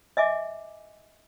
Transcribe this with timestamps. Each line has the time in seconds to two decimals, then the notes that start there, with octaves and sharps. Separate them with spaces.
0.17 D#5 E5 G#5 D6